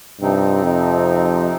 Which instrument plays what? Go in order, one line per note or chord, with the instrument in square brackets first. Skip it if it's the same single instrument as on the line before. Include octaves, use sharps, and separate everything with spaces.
[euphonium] G2 [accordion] C3 F3 C4 D#4
[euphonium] F2